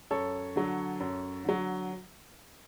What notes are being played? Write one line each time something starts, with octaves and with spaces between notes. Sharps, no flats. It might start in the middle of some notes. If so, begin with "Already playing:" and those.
F#2 A4 C#5
D3 F#3
F#2
D3 F#3